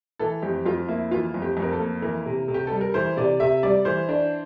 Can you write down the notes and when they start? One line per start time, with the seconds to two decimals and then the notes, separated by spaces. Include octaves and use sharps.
0.19 E3 A4
0.42 F2 G4
0.65 F2 F4
0.88 A#3 E4
1.11 E3 F4
1.34 F2
1.42 G4
1.57 F2
1.62 A#4
1.72 A4
1.80 A#3
2.02 E3 A#4
2.26 C3
2.48 C3
2.54 G4
2.67 G3 A4
2.81 A#4
2.94 E3 C5
3.17 C3 D5
3.40 C3 E5
3.63 G3 D5
3.85 E3 C5
4.09 D4